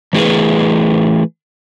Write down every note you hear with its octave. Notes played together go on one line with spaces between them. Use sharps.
E3 A3 E4 G#4 B4